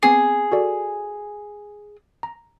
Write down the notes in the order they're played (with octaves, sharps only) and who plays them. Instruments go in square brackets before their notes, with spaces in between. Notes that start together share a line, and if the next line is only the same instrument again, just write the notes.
[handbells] B3 C4 C7 [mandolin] G#4
[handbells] F#4 A4 D5
A#5